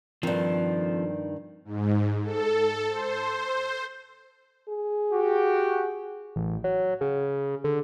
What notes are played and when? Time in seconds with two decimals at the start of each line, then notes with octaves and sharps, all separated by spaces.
0.23 G2 D#3 F3 C4
1.65 G#2
2.24 A4
2.89 C5
4.69 G#4
5.12 F#4 G4
6.36 A1
6.64 F#3
7.01 C#3
7.64 D3